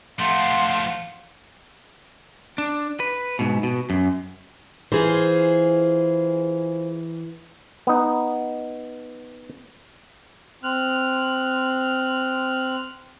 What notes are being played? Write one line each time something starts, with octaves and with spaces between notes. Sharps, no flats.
F3 A3 F5 F#5 C6
D4
B4
G#2 B2
B2
F#2
E3 F4 G#4 C5
B3 D#4
C4 F6 F#6